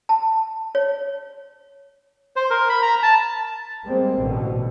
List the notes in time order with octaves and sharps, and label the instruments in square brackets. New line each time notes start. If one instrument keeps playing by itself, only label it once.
[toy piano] A5
C#5
[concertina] C5
A#4
B5
A#5
A5
[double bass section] G3 G#3 A#3 C4
A1 B2 D3